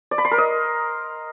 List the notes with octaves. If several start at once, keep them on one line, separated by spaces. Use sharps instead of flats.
D5
B5
C6
A#4
D#5